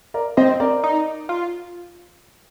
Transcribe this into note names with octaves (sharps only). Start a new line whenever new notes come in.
A#4 D5
C4 C5 D#5
A#4 D5
D#4
F4